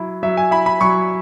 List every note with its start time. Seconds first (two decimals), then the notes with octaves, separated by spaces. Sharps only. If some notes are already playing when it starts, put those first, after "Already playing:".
Already playing: F#3 E4
0.23 F#3 E5
0.37 G#5
0.51 E4 B5
0.66 B5
0.81 F#3 C#6